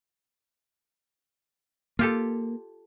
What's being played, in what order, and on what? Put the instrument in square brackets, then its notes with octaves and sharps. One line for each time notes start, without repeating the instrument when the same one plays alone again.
[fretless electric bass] A#3 [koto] F4 G4 A4